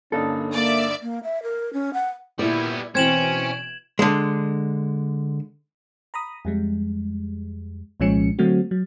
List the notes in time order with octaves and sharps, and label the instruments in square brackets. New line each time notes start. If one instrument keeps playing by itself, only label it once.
[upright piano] G2 D3 D#4 [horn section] A#3 C#4 [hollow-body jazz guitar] A4
[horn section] A#3 [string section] D5 E5
[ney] A#3
E5
A#4
C#4
F#5
[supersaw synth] A#2 E4 G#6 [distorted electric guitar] G3 B3 [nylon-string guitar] D5
[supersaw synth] B2 E3 D7 [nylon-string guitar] C4 [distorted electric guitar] C#4 [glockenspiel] G#6 E7 F#7
[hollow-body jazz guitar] D3 G#3
[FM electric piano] A#5 B5 D#6
F2 G3 G#3
C2 A#2 F3 G#3 C#4 C#7
D3 F#3 A3 C4 F#4
F#3